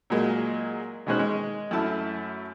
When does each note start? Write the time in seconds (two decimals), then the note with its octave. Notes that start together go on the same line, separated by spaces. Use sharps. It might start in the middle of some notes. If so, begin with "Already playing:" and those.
0.10 A#2 F#3 G#3 A#3
1.07 B2 D#3 G#3 C#4 C5 F#6
1.19 G#3
1.71 F#2 A3 E4 A5